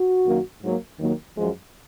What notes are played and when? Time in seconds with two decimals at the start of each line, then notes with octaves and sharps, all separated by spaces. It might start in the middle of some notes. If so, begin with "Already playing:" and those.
Already playing: F#4
0.25 F#2 D#3 F#3 A#3
0.62 G#2 F#3 A#3
0.99 D#2 D#3 F#3 A#3
1.36 F#2 F3 G#3